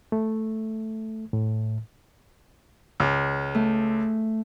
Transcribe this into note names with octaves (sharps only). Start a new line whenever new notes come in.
A3
A2
C#2
A3